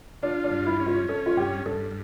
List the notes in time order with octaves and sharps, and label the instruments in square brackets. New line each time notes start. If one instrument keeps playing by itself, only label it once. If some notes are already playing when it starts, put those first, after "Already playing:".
[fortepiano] D4 [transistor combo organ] F4
[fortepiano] D4
[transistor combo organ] G2
[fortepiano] E4
[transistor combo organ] C#4
[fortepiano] F4
[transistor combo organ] C#4 [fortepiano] A4
[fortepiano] F4
[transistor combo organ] G2 [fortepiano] G4
[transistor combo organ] G2 [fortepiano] A4